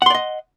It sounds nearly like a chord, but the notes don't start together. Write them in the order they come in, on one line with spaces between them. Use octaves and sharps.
F#5 C6 D5 D#5